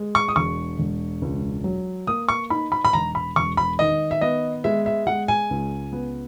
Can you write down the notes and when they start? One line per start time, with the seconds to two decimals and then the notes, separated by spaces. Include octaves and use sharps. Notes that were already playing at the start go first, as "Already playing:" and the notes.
Already playing: G#3
0.15 C#6
0.28 D#6
0.36 E1 C#6
0.79 E1
1.22 C#2
1.64 F#3
2.07 A#3 D#6
2.29 C#6
2.50 D#4 B5
2.72 B5
2.85 B5
2.93 E1 A#5
3.15 B5
3.36 E1 C#6
3.57 B5
3.79 D#3 D#5
4.11 E5
4.21 B3 D#5
4.64 G#3 E5
4.86 E5
5.07 G#3 F#5
5.28 G#5
5.51 C#2
5.93 B3